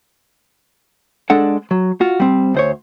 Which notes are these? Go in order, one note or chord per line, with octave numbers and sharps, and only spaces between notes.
G#3 D4 A4 F#5
F#3
F4 F#4
G3 C4
D2 C5 C#5